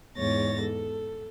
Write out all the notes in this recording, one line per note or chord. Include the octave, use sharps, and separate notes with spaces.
E2 G#2 C#5 A6 A#6
A4